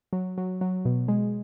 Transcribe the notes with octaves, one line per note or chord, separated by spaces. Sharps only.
F#3
F#3
F#3
B2
G#3